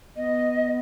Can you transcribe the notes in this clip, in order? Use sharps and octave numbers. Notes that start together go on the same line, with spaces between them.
B3 D#5